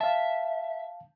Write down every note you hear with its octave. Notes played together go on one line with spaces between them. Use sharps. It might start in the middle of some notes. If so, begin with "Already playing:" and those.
E5 F5 A5